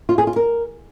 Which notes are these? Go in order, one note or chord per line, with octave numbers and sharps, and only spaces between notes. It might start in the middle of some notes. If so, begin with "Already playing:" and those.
F4
G#4
F4
A#4